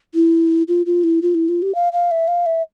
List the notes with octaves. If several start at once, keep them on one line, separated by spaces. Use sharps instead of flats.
E4
F4
F4
E4
F4
E4
F4
G4
F5
F5
E5
F5
E5